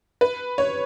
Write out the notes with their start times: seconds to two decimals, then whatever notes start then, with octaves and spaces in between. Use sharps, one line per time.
0.21 B4
0.58 C#5